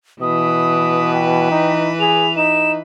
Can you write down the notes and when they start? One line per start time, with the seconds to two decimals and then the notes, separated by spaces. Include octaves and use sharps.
0.21 B2 E3 B4 D#6
1.14 G5
1.52 D#4
2.00 G#4 F7
2.37 D#4 E7